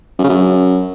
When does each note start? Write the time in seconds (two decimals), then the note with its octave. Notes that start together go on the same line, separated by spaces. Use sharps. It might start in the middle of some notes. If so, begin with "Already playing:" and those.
0.18 F#2
0.24 C#3
0.29 F#2